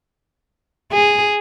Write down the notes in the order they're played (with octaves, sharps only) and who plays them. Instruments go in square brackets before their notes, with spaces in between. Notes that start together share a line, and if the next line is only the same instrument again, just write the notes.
[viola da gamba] G#4